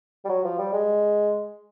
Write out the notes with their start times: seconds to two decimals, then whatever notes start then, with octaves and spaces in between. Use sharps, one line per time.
0.25 G3
0.29 F#3
0.44 F3
0.58 G3
0.73 G#3